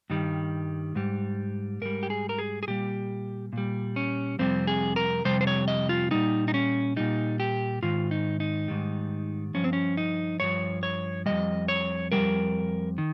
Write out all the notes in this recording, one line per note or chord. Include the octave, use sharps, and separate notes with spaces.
G2 D#3 G3
G#2 G3
G#2 G3 A#4
G4
G#4
A#4
G#4
G#4
A#2 G3 G4
A#2 G3
C#4
F2 C3 G3 C4
G#4
A#4
F2 C3 G3 C5
C5
C#5
D#5
F4
A#2 G3 D#4
D#4
C#4
A#2 G3 D#4
G4
G#2 D#3 F4
D#4
D#4
G#2 D#3 G3
G2 F3 C#4
C4
C#4
D#4
G2 F3 C#5
C#5
F2 D#3 G3 D#5
C#5
F2 D#3 G3 A#4
D#3